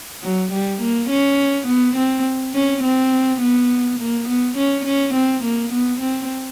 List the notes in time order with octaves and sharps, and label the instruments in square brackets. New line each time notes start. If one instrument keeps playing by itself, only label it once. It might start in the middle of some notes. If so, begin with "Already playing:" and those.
[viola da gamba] F#3
G3
A#3
C#4
B3
C4
C#4
C4
B3
A#3
B3
C#4
C#4
C4
A#3
B3
C4